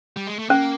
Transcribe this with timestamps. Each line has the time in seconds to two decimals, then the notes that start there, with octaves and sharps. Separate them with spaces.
0.17 G3
0.27 G#3
0.39 A3
0.49 A#3 C#4